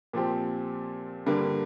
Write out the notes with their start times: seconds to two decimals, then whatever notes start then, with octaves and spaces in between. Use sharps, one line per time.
0.13 A#2 F3 C4 G4
1.26 G2 D3 G3 A#3